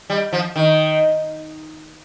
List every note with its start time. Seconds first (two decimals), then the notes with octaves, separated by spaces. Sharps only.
0.10 G3
0.33 F3
0.56 D#3